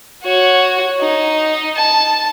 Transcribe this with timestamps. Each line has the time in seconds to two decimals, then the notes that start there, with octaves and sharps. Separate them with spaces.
0.24 F#4 C#5
1.00 D#4
1.76 A5